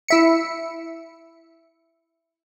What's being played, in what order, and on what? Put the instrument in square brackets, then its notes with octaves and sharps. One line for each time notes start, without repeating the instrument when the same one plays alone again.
[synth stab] E4 E5 C#7